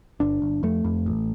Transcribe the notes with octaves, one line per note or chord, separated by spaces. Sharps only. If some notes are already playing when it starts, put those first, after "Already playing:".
G1 D4
G1
F2 A3
F2
A1